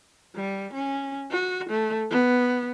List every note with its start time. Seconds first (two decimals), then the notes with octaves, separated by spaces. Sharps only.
0.35 G3
0.73 C#4
1.31 F#4
1.70 A3
2.10 B3